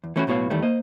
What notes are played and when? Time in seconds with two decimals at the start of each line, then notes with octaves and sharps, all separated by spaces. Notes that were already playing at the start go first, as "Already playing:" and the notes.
0.04 E2
0.16 E3 A3 C#4 D#4 E4 F#4
0.27 B1 A2 B3 F#4 C#5 F5
0.50 E2 D#3 G3 A3
0.63 A#3 C5 D#5